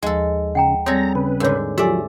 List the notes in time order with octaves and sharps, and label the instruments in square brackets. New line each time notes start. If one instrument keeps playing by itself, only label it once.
[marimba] D#2 F3 [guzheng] G#3 A4
[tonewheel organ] C#3 [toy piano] F#5 G5 A#5
[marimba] G3 C4 [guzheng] G#4 A4 [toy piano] C#5 D5 [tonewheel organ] A#5
[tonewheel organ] C#3 B4
[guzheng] G#2 D3 [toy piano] A#4 C#5
[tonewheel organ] F3 F#3 [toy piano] G4 E6 [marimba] A4 G#5 [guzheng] D5 E5